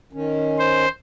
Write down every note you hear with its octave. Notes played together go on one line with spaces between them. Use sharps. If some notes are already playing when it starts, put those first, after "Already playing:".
D#3 C#4
C5